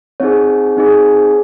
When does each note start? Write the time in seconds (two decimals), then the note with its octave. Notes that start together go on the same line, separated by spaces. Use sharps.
0.20 C4 D#4 G#4 C#5
0.77 C4 D#4 G#4